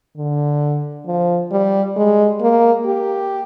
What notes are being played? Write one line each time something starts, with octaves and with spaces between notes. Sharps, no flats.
D3
F3
G3
G#3
A#3
G4